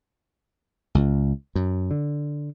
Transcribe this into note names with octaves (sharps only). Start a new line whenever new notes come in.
C#2
F#2
D3